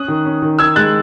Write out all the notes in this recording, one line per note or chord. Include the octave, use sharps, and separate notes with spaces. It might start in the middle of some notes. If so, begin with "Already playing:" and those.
Already playing: C#4 D#6 F#6
D#3
C#4
D#3
D#3 E6 G#6
G#3 F#6 A6